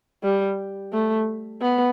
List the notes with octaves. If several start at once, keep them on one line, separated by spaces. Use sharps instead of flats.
G3
A3
B3